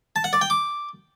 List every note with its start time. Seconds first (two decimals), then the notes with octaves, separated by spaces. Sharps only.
0.16 A5
0.24 F#5
0.33 D5
0.41 G5
0.50 D6